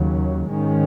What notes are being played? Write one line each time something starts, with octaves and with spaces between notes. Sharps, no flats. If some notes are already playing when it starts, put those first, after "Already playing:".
Already playing: D#2 C#3 F#3
G#2 D#3 G#3 C#4